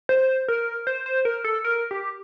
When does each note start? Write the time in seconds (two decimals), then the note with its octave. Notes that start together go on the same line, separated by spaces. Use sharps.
0.09 C5
0.48 A#4
0.87 C5
1.06 C5
1.25 A#4
1.44 A4
1.64 A#4
1.91 G4